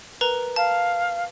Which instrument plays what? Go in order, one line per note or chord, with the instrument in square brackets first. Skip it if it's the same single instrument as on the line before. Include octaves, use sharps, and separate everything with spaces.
[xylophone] A#4 B4 A#5
[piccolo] F5 [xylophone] A5